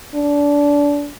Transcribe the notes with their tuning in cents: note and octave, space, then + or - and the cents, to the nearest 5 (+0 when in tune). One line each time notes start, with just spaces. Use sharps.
D4 -25